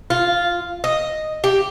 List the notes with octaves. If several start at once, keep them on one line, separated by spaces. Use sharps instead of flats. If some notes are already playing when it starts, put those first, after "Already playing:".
F4
D#5
G4